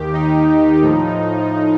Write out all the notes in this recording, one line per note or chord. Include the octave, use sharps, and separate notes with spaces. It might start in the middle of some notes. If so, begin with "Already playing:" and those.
Already playing: D#2 D#3 G4
D#4
A2 F3